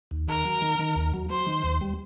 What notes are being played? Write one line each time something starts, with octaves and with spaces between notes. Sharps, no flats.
D#2
D#3 A#4
F#3
D#3
D#3
D#2
F#3
F#3 C5
D#3
D#2
G3